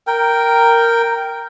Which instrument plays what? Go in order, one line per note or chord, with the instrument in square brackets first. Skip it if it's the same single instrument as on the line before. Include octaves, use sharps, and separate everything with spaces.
[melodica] A#4 G5